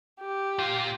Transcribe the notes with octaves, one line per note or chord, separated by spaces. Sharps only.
G4
A#2 F4